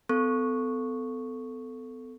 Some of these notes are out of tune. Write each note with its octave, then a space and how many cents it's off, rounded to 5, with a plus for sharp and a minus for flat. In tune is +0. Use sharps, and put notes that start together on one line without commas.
B3 +40 A4 +0 C#6 +0